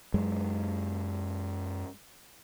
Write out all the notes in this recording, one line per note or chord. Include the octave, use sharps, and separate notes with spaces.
F#2 G#3